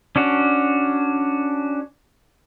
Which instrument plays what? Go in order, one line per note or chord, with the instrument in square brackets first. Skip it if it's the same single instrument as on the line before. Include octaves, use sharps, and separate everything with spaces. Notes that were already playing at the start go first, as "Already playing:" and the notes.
[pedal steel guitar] C#4 D4 F#4